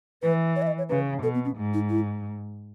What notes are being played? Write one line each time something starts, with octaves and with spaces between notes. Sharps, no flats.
E3 B4
C#5
E5
D#5
C#5
C#3 B4
B2 A4
B3
C#4
G#2
D#4
E4